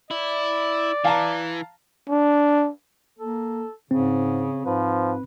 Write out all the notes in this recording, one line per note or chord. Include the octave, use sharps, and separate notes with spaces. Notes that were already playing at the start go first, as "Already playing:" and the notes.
E4 D5
E3 F5 A5 A#5
D4
A#3 A4
G#2 C#3 C4
G#2 F3 B4